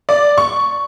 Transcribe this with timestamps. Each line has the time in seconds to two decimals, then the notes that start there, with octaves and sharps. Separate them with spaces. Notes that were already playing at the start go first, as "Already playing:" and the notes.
0.09 D5
0.38 C#6